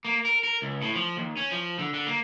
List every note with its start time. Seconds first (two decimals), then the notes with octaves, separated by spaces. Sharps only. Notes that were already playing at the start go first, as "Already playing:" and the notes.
0.05 A#3
0.25 A#4
0.43 A#4
0.62 C#2
0.82 A2
0.95 F3
1.17 D#2
1.37 C#4
1.51 F3
1.79 D3
1.94 D3
2.07 A#3